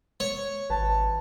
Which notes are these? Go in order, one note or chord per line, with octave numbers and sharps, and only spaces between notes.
C#5
G#1 B4 A5